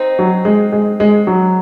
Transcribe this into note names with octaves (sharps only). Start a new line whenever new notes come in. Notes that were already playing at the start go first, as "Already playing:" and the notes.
Already playing: C4 D#4
F#3
G#3
G#3
G#3
F#3